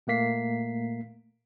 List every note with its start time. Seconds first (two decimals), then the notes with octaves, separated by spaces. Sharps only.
0.07 A#2 A3 A#3 B6 C7